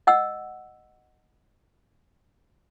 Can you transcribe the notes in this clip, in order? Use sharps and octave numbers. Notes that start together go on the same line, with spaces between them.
D#5 F#5 E6